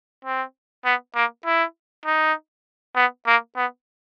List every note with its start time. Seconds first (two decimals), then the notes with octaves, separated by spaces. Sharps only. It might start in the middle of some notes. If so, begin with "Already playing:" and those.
0.25 C4
0.85 B3
1.15 A#3
1.46 E4
2.06 D#4
2.96 B3
3.27 A#3
3.56 B3